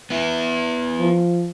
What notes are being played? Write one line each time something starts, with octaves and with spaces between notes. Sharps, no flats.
B3 E4
F3